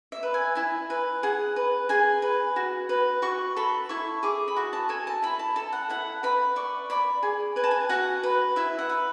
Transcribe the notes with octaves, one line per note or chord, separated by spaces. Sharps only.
E5
B4
G#5
E4 G#5
B4
G#4 F#5
B4
G#4 G#5
B4
F#4
B4
F#4 C#6
A4 B5
E4 C#6
G#4 D6
B5
F#4 C#6
A5
A4 G#5
A5
E4 B5
A5
A4 A5
F#5
E4 F#5
B4 B5
D5 C#6
D5 B5
G#4
B4 G#5
A5
G#5
F#4 F#5
B4
E4 E5
F#5
B4